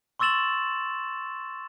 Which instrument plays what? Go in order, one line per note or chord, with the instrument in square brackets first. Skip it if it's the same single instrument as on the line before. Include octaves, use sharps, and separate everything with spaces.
[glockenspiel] C6 C#6 E6 A6 E7 F#7